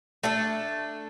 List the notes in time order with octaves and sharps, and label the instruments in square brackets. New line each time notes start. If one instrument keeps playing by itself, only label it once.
[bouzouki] A3 D4 A4